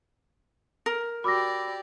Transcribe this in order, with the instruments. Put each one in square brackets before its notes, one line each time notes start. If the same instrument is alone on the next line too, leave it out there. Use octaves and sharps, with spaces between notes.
[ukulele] A#4
[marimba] F#4 D6 [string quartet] G4 D5 [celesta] B5 E6 A#6